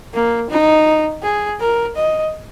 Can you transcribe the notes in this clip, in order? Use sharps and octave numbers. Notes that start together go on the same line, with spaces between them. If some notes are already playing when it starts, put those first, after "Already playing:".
A#3
D#4
G#4
A#4
D#5